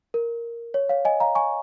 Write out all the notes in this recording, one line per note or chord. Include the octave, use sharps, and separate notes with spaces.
A#4
C#5
C#5 F5
D#5 G#5
F5 A#5
G#5 C#6